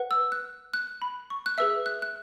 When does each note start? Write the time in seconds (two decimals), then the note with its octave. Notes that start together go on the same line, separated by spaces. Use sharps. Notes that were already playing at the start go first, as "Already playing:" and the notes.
Already playing: B4 F#5
0.11 E6
0.32 F#6
0.74 F#6
1.02 B5
1.30 C#6
1.46 F#6
1.58 G#4 B4 E5 E6
1.86 F#6
2.02 F#6